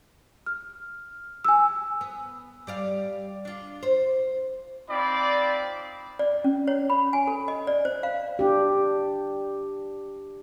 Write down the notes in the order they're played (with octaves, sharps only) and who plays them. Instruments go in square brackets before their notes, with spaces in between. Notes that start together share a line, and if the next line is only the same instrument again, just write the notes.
[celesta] F6
G#5 E6
[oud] B3
G3 D5 F5
D4 F4
C5
[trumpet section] C4 D#4 F4 D5 B5
[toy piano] D5
C#4
C#5
B5
G#5
A4
D#5
D5
C5
F5
[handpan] D4 G4